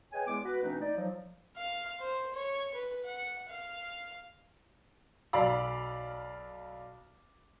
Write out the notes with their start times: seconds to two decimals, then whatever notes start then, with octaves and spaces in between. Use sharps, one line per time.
0.12 G#4 B4 C#5 D#5 G5 G#5
0.26 E2 G#3 B3 D6
0.44 F#4 B4
0.63 B2 E3 A3 C4 D4 D#4
0.80 D#4 D5
0.97 F3 F#3
1.56 F5
2.01 C5
2.34 C#5
2.74 B4
3.05 F#5
3.49 F5
5.33 B1 D5 F5 B5